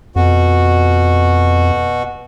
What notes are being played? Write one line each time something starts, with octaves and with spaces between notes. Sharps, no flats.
F2 B2 F#4